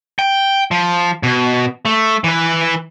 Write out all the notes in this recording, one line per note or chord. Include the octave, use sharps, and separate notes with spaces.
G5
F3
B2
A3
E3 B4